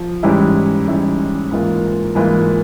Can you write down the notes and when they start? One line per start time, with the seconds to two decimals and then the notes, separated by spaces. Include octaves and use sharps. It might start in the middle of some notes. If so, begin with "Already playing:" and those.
Already playing: F3
0.23 G#2 E3 G3 C#4 E4
0.87 G#2 E3 G3 C#4 E4
1.51 G#2 E3 A#3 F4
2.15 G#2 E3 A#3 F4